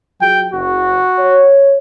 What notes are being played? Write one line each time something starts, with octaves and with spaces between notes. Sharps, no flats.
F#3 F4 G#4 G5
F#1 F#4
C#5